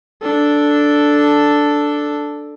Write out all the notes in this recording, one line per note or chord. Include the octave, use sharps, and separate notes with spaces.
D4 A4